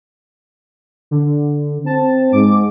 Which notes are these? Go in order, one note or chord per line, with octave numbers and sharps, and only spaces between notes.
D3
C4 A5
G#2 D6